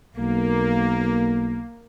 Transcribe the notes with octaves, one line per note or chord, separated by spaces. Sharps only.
B1 A#3